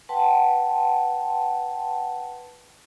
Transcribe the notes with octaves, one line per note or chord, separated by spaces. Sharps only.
B4 F#5 G5 A5 C6